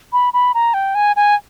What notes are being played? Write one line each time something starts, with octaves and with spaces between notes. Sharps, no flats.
B5
B5
A#5
G5
G#5
G#5